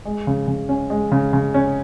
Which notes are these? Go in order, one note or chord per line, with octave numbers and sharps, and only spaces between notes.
G#3
C#3
C#3
C#4
G#3
C#3
C#3
C#4